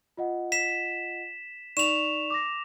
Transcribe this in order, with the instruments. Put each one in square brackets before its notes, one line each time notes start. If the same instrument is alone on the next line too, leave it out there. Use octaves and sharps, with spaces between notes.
[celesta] F4 D#5 F#5
[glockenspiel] B6 E7
[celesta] D#4 D5 C#6 [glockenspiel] E7 F7
[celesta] D6 A#6